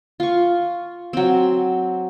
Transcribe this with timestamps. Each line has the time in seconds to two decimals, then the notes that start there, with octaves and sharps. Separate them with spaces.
0.20 F4 C#6
1.13 F#3 C4